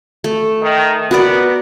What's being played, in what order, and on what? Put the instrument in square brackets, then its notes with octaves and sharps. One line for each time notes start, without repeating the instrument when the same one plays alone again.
[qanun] A3
[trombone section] D#3
[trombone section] B3 [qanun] F#4 A#4 D5